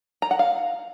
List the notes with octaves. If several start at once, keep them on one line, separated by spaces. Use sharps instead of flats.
A#5
F#5
F5